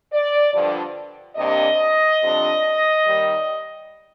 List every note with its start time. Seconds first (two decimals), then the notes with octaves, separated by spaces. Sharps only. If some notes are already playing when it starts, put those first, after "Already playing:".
0.12 D5
0.53 G2 D3 F3
1.37 C3 G3 A#3 D4 D#5
2.21 F2 C3 G3 D4
3.04 D#2 D#3 G3